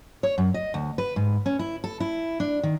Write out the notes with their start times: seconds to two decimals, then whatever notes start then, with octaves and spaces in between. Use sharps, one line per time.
0.23 C#5
0.38 F#2
0.54 D#5
0.74 D2
0.98 B4
1.16 G#2
1.46 C#4
1.59 E4
1.84 A4
2.00 E4
2.40 D4
2.63 D#3